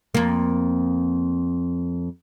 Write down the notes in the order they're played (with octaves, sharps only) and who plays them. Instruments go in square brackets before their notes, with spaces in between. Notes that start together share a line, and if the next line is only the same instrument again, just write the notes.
[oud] F2 A#3